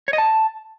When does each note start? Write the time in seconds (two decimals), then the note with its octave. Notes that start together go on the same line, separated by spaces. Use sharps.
0.08 C#5
0.13 D#5
0.18 A5